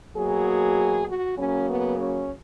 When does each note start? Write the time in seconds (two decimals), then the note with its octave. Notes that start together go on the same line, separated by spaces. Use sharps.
0.15 B2 F#3 A#3 G#4
1.07 F#4
1.37 C#3 F#3 A#3 C#4
1.67 B3
1.98 C#4